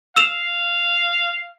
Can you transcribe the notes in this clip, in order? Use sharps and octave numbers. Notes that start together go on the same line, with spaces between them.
F5 E6 E7 F7